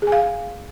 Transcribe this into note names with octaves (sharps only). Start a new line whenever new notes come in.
G#4
G#5
F5